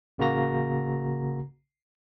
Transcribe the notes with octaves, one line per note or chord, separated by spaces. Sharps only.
A1 C#3 A#3 F#4 A#5 A#6